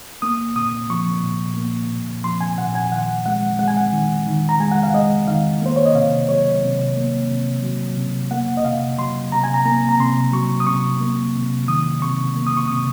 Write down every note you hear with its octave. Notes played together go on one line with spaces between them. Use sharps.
A#3 D#6
A#2 D#6
F3 C#6
A#2
A#3
A#2
F3 C6
G#5
A#2 F#5
G#5
D#3 F#5
G#3 F#5
G#3 F#5
G#5
F#5
D#3
D#3
A#5
G#3 G#5
F#5
F5
G#3 D#5
D#3 F5
A#3 C5
C#5
D#5
C3 F5
F#3 C#5
C3
A#3
C3
F#3
C3
A#3 F#5
D#5
C3 F5
F#3 C6
C3 A#5
G#5
A#5
A#3 A#5
A#5
C3 C6
F#3 C#6
D#6
C3 C#6
A#3
C3
D#3 D#6
C3 C#6
A#3
D#6
C#6
C3 D#6